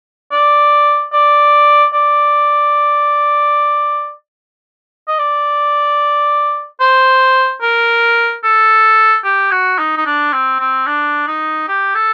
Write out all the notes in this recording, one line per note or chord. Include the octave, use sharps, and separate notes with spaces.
D5
D5
D5
D#5
D5
C5
A#4
A4
G4
F#4
D#4
D#4
D4
C4
C4
D4
D#4
G4
A4